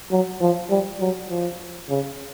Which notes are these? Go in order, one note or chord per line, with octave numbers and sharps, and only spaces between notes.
F#3
F3
G3
F#3
F3
C#3